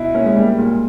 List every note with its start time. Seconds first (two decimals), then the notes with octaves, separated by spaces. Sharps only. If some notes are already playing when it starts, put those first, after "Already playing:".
Already playing: B2 E4
0.15 A#3 C#4
0.26 G#3
0.36 G3 A#3
0.58 A#2 A#3